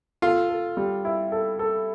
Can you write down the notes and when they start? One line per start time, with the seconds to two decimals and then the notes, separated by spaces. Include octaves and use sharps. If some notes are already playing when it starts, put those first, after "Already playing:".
0.22 F4 A4
0.49 A4
0.77 G3
1.05 E4
1.32 A4
1.59 A4